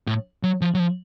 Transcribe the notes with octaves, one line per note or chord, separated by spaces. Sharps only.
A2
F#3
F3
F#3
F3